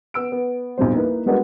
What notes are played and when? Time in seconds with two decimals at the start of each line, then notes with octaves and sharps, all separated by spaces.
0.14 B3 E6 D7
0.32 B3
0.78 B1 F2 G3 C5
0.94 A#3 D#4 E4 B4
1.26 G3 G#3 B3 D4 F#4 A#4